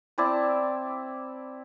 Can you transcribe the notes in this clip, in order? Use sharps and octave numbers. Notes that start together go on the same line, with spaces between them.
C4 E4 D5 A5